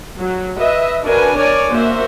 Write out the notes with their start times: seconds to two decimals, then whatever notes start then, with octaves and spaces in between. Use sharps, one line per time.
0.18 F#3
0.58 B4 D#5 E5
1.03 D4 F#4 A#4 B4 G#5
1.37 A#4 C#5 D5 G#5
1.69 A#3 F#4 C5 E5